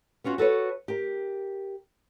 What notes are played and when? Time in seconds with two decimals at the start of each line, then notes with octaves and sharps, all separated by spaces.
0.24 B3 C#4 F4 F#4
0.38 F#4 A4 B4 C#5
0.88 G4 A#4